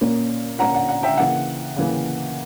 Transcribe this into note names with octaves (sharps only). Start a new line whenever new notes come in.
A#2 A#3 C#4
A#2 A#3 C#4 F#5 A#5
F#5
F#5
E5 G5
C#3 E3 A#3 F#5
C#3 E3 A#3